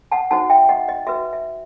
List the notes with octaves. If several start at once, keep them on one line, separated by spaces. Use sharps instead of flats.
F#5 A5
D#4 F#4 C5 F#5 A5
E5 G5
D#5 F#5
D#5
F#4 B4 E5
E5